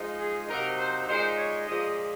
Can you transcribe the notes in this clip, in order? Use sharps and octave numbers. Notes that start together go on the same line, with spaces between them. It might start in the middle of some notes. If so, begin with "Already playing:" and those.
Already playing: F3 G#3 D#4
G#4
C3 F#3 A#3 D#4 A#4
C5
A#2 G#3 D#4 C5
C#5
A#2 F3 G#3 D#5